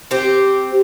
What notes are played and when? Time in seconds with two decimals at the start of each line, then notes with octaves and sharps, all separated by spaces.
0.11 C4 G4